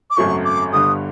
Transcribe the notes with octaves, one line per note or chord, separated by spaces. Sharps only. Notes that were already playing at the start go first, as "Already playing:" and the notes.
D6
G#1 F#2 C#3 F#3 A3 C#6
D6
G1 G2 D3 G3 D#6